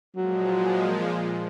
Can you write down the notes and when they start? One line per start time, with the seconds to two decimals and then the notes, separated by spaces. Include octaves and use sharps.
0.16 A#2 F3 F#3 G#3